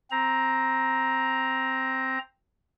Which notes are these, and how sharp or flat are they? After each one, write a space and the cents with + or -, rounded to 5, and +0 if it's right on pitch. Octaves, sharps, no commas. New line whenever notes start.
C4 +0 A#5 +10